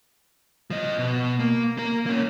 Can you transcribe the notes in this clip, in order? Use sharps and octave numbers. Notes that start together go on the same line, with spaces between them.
F3 D#5
B2
A#3
A#3 A#4
A#3 C#4